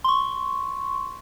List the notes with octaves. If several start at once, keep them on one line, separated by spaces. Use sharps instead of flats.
C6 C#6